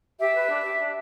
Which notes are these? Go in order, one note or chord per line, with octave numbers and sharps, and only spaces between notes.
G4 E5
B4
D4
G4
D4